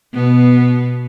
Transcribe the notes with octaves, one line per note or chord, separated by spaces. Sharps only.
B2 B3